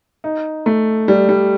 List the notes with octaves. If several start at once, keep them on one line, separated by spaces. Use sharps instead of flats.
D#4
A3
G3
G3